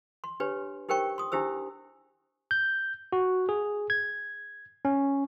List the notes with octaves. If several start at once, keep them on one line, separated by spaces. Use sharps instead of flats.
C6
D4 G4 B4 C#5
D#4 G4 A#4 C5 G5 C#6
C6 D#6
D4 E4 G4 C5 E6
G6
F#4
G#4
G#6
C#4